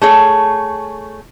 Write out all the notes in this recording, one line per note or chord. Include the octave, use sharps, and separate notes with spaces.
A3 G#4 C#5